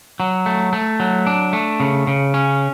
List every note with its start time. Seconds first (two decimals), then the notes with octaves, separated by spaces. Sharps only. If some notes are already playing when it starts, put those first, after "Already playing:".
0.20 F#3
0.46 A3
0.73 A3
1.00 F#3
1.27 D4
1.53 A3
1.80 C#3
2.07 C#3
2.34 C#4